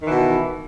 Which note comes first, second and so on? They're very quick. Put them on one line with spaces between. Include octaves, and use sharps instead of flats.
D#3 E3 B2